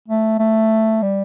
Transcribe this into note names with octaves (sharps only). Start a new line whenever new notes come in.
A3
A3
G3